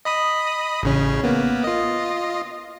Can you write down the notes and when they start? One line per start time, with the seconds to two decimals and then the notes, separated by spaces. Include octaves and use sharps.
0.05 D#5 B5 D#6
0.83 A1 C#3 C#4
1.24 A#3 B3
1.64 F4 D#5